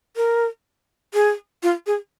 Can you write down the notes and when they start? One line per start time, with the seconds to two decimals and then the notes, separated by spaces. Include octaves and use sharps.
0.16 A#4
1.14 G#4
1.63 F4
1.86 G#4